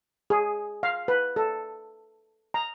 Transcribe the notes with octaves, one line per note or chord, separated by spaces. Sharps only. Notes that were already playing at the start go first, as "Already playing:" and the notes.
G#4
F5
B4
A4
A#5